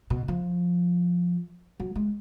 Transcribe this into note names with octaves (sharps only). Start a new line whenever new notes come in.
B2
F3
F#3
G#3